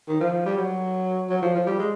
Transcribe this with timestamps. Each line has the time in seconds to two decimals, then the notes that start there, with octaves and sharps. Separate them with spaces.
0.08 D#3
0.20 F3
0.46 G3
0.57 F#3
1.29 F#3
1.42 F3
1.55 F3
1.67 G3
1.79 G#3